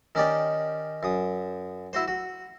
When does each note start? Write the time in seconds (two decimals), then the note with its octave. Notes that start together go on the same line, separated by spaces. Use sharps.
0.15 D#3 C#4 D#4 G4 D5 D#5
1.03 F#2 D#6
1.93 E4 F#4 C5
2.08 F#4